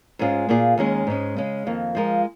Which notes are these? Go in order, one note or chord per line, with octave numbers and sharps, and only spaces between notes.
G#2 G#3 C#4 F4 G#4
A#2 A#3 F4 G#4
D#2 D#3 G#3 C#4 G#4
G#2 G#3 C#4
C#3 G#3 C#4
F2 D#3 A#3
F3 G#3 F4 A#4